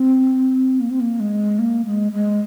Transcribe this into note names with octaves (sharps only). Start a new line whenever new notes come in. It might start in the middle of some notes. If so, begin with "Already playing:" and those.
Already playing: C4
A#3
C4
A#3
G#3
A#3
G#3
G#3